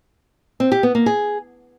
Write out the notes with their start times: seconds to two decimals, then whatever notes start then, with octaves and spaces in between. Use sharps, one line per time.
0.60 C4
0.72 G4
0.83 B3
0.95 A#3
1.06 G#4